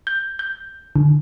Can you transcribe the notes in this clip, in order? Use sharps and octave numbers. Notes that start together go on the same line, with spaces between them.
G6
G6
D3